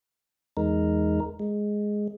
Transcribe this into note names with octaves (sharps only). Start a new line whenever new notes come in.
E2 G#3 D#4 A#4
G#3